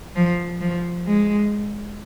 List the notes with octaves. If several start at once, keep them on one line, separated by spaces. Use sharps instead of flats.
F3
F3
G#3